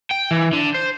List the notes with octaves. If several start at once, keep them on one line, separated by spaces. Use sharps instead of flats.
G5
E3
D3
C5